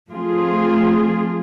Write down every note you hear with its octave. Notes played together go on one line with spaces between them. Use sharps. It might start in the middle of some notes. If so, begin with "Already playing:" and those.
F3 A3 C4 F4 G#4